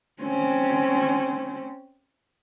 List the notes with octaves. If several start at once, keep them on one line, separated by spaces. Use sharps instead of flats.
C4 C#4